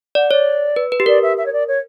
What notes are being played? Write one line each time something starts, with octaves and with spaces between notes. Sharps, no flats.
D5 F#5
C#5 D5
B4
B4
G4
A#4 D5
E5
E5
C#5
D5
C#5